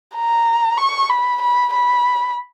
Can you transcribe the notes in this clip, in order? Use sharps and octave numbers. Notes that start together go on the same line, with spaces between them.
A#5
C#6
B5
B5
B5